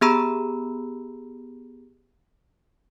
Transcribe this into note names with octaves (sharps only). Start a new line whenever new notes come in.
B3 G4 G#4 A#5 B5 E6